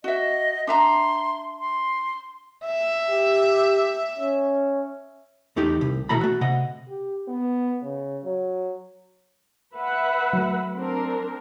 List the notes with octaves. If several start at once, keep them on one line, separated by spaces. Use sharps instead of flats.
F#4 D#5 E5
D4 E5 A#5 C6
C6
E5
G4
C#4
E2 A3 D#4 G4
C2
B2 E3 A3 A#5 B5
A3 F#4
C3 D#5 F#5
G4
B3
C#3
F#3
B4 E5 F#5
F#3 A3
C4 D4 A#4